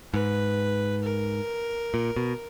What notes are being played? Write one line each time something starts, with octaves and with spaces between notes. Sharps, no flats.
G#2 B4
A#4
A#2
B2